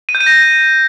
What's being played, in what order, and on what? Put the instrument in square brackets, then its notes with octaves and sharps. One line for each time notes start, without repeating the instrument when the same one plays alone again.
[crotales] D#7
G6
D#7
A#6